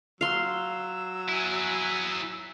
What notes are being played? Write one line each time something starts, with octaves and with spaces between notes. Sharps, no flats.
F#3 F5 C6 E6
E4 G#4